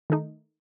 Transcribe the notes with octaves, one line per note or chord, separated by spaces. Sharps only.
D#3 A3 D#4